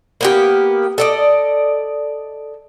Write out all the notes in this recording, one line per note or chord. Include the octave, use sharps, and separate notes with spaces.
A#3 B3 G4
A4 D5 D#5